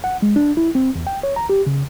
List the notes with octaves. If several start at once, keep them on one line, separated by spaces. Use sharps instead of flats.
F#5
G#3
D4
E4
C4
E2
G5
C#5
A#5
G4
C#3